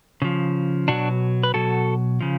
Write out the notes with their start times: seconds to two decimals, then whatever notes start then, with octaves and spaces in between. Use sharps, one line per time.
0.22 C#3 F3
0.88 B2 F#3 D4 F#4
1.43 B4
1.54 B2 F#3 F#4 A4
2.21 C#3 F3